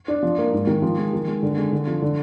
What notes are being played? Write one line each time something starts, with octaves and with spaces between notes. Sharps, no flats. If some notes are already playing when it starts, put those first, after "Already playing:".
D4
F3
A#3
G#2
D#3
F3
G#3
D#3
G#3
D3
G#3
D3
F3
D3